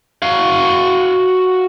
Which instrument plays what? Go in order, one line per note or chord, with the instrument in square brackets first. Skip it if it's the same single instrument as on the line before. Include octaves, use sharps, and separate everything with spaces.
[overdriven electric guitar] F#4 F5